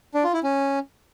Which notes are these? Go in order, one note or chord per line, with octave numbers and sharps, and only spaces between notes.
D4
F4
E4
C#4